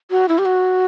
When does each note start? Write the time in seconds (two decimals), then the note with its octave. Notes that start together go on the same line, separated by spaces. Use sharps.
0.11 F#4
0.29 E4
0.38 G4
0.45 F#4